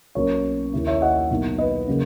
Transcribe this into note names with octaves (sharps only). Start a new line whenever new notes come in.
B1 B2 A#3 C#4 A#4 C#5
D#2 D#3 A#3 E4
C#5 E5
D#5 F#5
B1 B2 A#3 D#4
B4 D#5
C#3 F#3 A#3